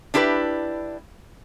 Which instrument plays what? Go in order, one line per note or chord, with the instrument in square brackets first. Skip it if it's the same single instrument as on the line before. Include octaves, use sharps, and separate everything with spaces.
[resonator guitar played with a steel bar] D4 E4 G4 A4 B4